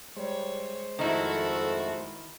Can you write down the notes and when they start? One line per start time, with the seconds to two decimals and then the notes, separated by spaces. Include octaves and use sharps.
0.17 G3 G#3 C5 C#5
0.99 F2 D#3 A3 E4 F#4 E5 A5